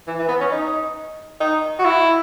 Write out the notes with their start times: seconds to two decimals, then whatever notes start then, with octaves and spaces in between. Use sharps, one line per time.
0.07 E3
0.18 E3
0.28 B3
0.40 C#4
0.51 D#4
1.40 D#4
1.79 F#4
1.84 E4